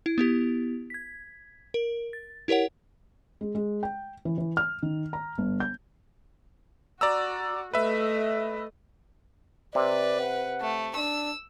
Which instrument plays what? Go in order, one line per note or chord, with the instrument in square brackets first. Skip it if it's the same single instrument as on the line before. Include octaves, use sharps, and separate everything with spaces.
[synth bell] E4
B3 E4 G4
G#6 B6
A#4
A6
E4 G4 A#4 C#5 F#5
[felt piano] G#3
G#3
G5
E3
E3
F6
D#3
A#5
G1
G6
[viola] F#4 [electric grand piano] D5 A#5 E6
[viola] A3 D#5 [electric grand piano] B4 E5
[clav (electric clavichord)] C3 [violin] B4 [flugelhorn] D5
[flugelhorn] F#5
[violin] A3
[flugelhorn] D4 [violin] E6